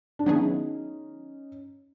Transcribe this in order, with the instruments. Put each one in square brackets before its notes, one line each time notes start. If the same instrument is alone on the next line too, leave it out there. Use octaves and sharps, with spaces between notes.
[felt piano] D4
[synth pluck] D#3 F#3 B3 E4 G#4 [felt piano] C#4 D#4